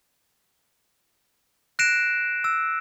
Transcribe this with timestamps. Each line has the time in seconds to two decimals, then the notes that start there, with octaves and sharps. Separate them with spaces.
1.79 F#6 A#6 C7 D7 E7
2.44 E6